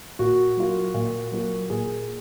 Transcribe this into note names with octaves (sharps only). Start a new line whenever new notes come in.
A#2 F#4
F#3 A#3 F4
A#2
F#3 A#3 F4
A#2 G#4